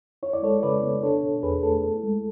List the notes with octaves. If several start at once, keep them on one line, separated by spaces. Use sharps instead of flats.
E4 C#5
D5
G#3 A4 C#5
C#3 B4 D5
B3
D4 A4 C#5
B2
E2 G#4 B4
A3 A4
E4
G#3